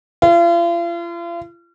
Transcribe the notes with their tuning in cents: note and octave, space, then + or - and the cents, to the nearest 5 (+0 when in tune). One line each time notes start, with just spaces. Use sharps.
F4 -40